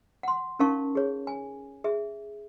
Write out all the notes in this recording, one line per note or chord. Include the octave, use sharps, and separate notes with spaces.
F#5 C6
C#4 D#4 A#4 F5 A5 C#6
G#4 C#5
G#5
G#4 E5